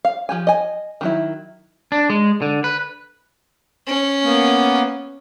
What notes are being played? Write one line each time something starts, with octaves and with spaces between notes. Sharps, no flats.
F5
F3 G4 G#5
D#5 G#5
D#3 F#3 E4
D4
G#3
D3
B4
C#4
A#3 B3